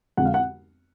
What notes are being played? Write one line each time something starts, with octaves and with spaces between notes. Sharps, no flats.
F2 D3 G#3 F#5
F5
F#5